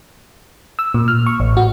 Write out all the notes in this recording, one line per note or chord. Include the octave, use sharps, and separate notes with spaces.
E6
A#2
F6
C#6
A1
F#4